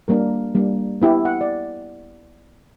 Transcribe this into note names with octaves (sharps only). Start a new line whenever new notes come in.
G3 A#3 D4 A#4
G3 A#3 D4
B3 E4 G4
F#5
D5